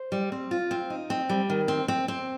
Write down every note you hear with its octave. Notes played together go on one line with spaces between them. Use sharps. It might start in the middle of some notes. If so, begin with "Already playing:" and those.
Already playing: C5
G3
C4
F4
C4
D#4
C4
G3
D#3
C4
C4
C4